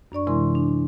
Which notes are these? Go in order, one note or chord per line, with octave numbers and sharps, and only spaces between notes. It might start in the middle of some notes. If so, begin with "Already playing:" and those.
F#2 D4 D5 C#6
C3 E3 G#3 E4 A#4 C6
D4